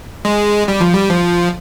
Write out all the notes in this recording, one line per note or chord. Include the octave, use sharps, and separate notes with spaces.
G#3
G3
F3
G3
F3